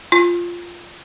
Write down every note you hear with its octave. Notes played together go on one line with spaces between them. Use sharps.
F4